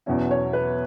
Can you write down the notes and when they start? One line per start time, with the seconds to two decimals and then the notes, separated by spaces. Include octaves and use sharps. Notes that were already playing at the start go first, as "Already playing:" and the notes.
0.06 E2 B2 F#3 C#4 E4
0.31 C#5
0.53 B4